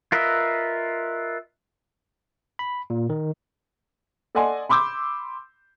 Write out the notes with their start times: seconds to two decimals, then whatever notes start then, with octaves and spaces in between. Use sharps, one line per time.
0.12 F4 A#4 B4 D#5 E5
2.59 B5
2.90 A#2
3.10 D#3
4.35 A4 D5 D#5 F#5 G#5 C6
4.69 B5 C6 D6 E6 G6